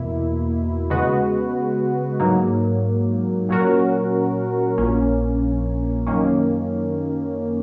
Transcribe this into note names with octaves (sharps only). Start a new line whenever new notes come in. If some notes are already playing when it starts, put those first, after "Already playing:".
Already playing: E2 B2 A#3 E4
C#3 G#3 B3 F#4 B4
G#2 F#3 A#3
A#2 F#3 C#4 F#4 A#4
A#1 A#2 A#3 C#4
F#2 D#3 A#3 C#4